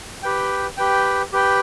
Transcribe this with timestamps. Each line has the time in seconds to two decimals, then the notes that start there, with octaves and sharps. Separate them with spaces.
0.23 G4 B4 G5
0.78 G4 B4 G5
1.33 G4 B4 G5